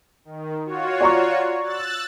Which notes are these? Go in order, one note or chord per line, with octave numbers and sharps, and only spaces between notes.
D#3
F4 F#4 C#5
D5 A#5 C#6
E6 F#6 A6